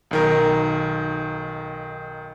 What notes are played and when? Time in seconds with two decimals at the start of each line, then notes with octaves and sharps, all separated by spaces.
0.11 B1 D#3 A#4